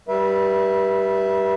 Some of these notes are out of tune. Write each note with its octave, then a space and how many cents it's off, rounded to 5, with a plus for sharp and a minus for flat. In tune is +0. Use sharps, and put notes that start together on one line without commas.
G3 -10 B4 -35 E5 +0